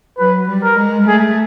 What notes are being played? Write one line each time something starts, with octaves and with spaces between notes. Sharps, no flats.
F#3 B4
G3
A#4
G#3
A3 G#4